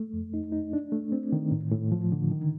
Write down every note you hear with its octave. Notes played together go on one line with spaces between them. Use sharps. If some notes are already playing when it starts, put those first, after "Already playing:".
Already playing: A3
F2
D#4
D#4
D4
A3
C4
D#3
A2
A2
F3
D3
D#3